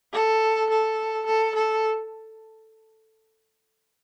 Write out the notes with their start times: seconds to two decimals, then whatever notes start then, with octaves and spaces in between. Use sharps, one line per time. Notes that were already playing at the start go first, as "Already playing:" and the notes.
0.13 A4
0.70 A4
1.26 A4
1.55 A4